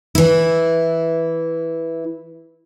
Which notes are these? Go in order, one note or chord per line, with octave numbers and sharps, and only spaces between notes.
E3 E4